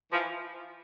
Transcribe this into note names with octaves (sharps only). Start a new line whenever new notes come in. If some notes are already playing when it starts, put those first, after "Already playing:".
E3 F3